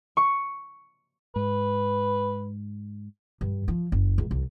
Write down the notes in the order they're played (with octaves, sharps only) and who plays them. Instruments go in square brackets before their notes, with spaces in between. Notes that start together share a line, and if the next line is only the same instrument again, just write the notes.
[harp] C#6
[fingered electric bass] G#2 [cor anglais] B4
[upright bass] G2
F3
F#1
C#2
C2